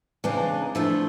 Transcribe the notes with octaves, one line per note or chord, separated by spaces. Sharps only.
C#3 E3 G#3 C4 D4
D4
D#4
D3 F3 A3 E4